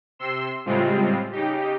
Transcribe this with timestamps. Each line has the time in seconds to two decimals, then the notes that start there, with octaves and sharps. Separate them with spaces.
0.19 C3 C6 E6
0.65 A2 C#3 G3 G#3 C4 F4
1.31 C#3 D#4 G4